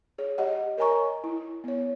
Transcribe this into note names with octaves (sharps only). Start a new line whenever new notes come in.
G#4 C#5
G4 D#5 F#5
A#4 C#5 D#5 G#5 A#5 C#6
E4
B3 C#5